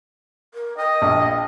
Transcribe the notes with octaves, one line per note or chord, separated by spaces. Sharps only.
A#4
D#5 G5
A#1